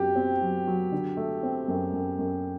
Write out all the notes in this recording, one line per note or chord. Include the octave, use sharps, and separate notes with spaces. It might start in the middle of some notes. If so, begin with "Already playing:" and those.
Already playing: F#2 F#3 C4 G4
C4
F#3
F#3
D3
A3
C4
F#2
F#2
F#2